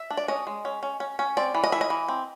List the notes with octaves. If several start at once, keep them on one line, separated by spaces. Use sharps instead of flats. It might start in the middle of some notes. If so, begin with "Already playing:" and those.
Already playing: E5
D4
D5
C#4 D#5
G#3
C#4
C#4
C#4
C#4
C4 D5
E3
D#5
E3 E5
D#5
E3
C4